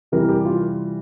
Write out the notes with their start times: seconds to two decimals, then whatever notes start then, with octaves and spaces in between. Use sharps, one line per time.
0.12 C3 E3 G3 A#4
0.29 G4
0.45 F4